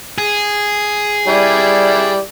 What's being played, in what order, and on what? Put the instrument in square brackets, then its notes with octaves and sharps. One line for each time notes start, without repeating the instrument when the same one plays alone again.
[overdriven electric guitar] G#4
[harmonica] G3 E4 D5